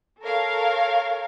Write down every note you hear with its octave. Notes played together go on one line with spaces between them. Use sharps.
A4 A#4 C#5 F5